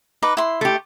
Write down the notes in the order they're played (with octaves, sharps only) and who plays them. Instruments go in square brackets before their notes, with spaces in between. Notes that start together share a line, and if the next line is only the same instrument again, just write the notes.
[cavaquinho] D#4 B4 D6
E4 C6
[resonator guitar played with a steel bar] A3 G4